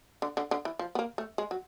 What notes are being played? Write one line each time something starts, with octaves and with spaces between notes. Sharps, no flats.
D3
D3
D3
E3
F3
B3
A#3
A3
G#3
F#3